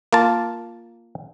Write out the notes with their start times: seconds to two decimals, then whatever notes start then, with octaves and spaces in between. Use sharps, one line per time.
0.13 A#3 F4 A5